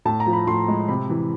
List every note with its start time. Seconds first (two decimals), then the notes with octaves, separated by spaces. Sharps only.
0.05 A2 A5
0.20 A#5
0.27 F3
0.33 B5
0.47 A2 C6
0.68 G#3
0.88 C3 B5
1.09 E3